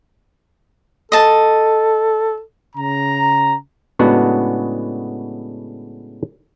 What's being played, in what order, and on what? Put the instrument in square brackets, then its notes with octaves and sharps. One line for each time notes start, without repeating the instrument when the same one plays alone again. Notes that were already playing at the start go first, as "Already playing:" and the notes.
[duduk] A4 [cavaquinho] D#5 A5
[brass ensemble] C#3 A#5
[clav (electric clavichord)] A2 C#3 G#3 B3 D4 F#4